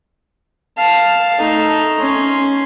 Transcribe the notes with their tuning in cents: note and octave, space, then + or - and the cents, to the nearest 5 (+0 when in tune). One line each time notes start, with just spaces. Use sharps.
F5 +0 A5 +0
A3 +0 D#4 +0
C#4 +0 C6 +0